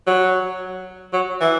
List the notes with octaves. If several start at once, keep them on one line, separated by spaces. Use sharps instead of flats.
F#3
F#3
E3